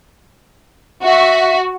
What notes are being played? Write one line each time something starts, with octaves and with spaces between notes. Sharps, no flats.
F#4 E5